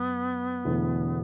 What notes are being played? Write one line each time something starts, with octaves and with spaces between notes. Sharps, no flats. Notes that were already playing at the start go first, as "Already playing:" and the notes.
Already playing: F#2 B3
E1 E2 D3 A3 E4